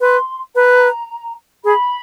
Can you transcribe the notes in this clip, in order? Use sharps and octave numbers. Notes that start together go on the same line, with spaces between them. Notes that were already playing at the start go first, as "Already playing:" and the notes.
B4 C6
B4 A#5
G#4 B5